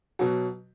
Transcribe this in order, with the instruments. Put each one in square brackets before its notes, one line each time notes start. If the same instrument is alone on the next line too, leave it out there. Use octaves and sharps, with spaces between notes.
[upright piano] B2 F#3